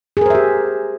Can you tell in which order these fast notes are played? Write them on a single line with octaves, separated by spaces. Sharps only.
G#4 A#4 C5 E5 G4